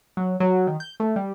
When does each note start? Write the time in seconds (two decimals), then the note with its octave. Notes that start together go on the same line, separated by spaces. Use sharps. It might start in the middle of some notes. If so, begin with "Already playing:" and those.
0.17 F#3
0.40 F#3
0.67 D#3
0.80 G6
1.00 A3
1.16 G3